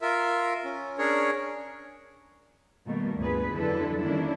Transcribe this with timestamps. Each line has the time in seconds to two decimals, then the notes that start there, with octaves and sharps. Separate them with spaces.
0.01 F4 A#4 E5
0.65 C#4
0.98 C#4 D4 G#4 A#4 C#5
2.87 B2 D#3 G3 A3 A#3
3.18 D2 G2 A#2 B3 G#4 B4
3.53 F2 D3 F#3 E4 A4 B4
4.01 D#3 G3 A#3 C#4 D4 E4